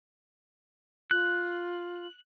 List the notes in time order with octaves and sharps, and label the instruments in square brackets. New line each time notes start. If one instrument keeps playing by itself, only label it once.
[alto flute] F4 [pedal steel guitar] F#6